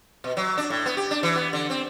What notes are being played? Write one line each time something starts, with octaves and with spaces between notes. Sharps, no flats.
B2
F#3
D4
A2
B3
G4
D4
E3
B3
D3
C4